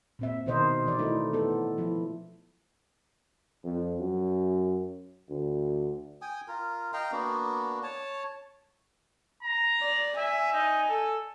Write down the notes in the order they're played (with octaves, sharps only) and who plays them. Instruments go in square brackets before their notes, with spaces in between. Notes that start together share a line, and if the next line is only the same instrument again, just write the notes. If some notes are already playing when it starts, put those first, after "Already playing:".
[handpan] A#2 C4 E5
B2 D#3 A#4 C5 D#5
E3 D5
A3 D#4 E4
B3 A4
F3 E4
[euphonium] F2
F#2
D2
[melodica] G5 G#5 D#6
F4 A#4
D#5 F5 G5 A#5
A#3 B3 D4 F#4
C#5 A5
[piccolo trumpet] A#5
[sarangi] D5
[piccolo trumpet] E5 [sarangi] G#5
[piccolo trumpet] D#4
A4